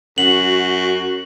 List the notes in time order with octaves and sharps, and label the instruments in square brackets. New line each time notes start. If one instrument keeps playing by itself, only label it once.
[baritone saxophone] F#2 [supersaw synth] F#4 [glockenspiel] F#7